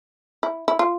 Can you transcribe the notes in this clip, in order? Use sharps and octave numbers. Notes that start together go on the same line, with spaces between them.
E4
E4
F4